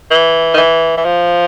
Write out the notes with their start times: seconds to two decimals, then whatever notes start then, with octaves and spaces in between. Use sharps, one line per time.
0.11 E3
0.54 D#3
0.57 E3
0.97 E3
1.05 F3